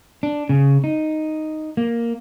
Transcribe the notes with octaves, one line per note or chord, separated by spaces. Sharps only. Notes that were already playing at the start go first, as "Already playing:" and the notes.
D4
C#3
D#4
A#3